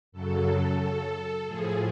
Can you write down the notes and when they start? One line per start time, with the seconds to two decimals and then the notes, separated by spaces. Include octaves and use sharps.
0.12 F#2 C#3 F#3 A4
0.79 A4
1.46 A2 F3 G#4